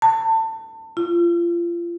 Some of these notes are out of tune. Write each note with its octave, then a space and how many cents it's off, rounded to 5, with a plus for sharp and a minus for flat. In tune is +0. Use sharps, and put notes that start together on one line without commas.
A5 +25
F4 -30